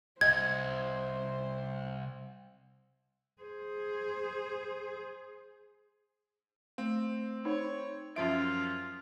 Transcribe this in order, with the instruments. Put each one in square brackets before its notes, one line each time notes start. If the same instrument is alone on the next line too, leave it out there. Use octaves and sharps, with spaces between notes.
[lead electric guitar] C2 [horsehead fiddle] C5 [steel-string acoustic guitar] D#5 [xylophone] G#6
[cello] G#4 C5
[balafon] A3 [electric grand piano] C4
[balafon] D#4 C5 [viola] C#5
[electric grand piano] F#2 F3 D7 [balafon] C#4 E5 [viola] F4